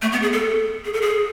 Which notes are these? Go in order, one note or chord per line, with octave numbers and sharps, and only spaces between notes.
A3
B3
G#4
A4
G#4
A4
G#4